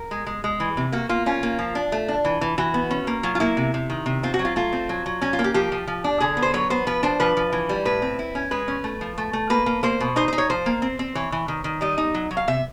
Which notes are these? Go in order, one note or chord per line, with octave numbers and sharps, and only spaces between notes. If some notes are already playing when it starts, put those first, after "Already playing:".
Already playing: A#4
G#3
G#3
G#3
E3
C3
A#3 F#4
A#3 F4
C#4 F4
A#3
F3
D4
A3
D4
E3
E3
E3 F#4
B3
C#4
A#3
F#3 F4
F4
A#3 E4
C3
C3
D#3
C3
C4 F4
F#4
F#3
F4
A3 F4
C4
F#3
F#3
C#4 F#4
F4
A#3
G4
F3 G4
F3
F3
D4
D3 G#4
B3
C5
F#3 C#5
B3 C5
F3 B4
D4 C5
F3 B4
F3
E3
G3
A2 B4
C4
E4
C#4
G#3 B4
C#4
A3
F3
A3
A3
A#3 B4
A#3
A#3 C5
B2
D#4 C5
D#4 C5
C#5
F3 C5
A#3
C4
C4
E3 C#5
E3
D#3
D#3
G3 D#5
D#4
F#3
F#3
F5
C3 E5